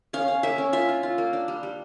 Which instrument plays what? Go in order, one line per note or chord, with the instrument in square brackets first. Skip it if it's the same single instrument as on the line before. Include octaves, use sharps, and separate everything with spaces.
[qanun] C#4 F5
C#4
A#3 E5
C#4
F4 E5
F4
F4
A#3
D4
G3
G3